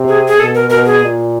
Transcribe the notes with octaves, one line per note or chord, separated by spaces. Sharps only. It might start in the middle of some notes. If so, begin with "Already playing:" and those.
Already playing: C3
G#4
G#4
B2 A4
A#4
B2 A#4
G#4
A#2